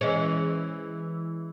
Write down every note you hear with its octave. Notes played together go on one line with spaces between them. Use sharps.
E3 G#3 C#4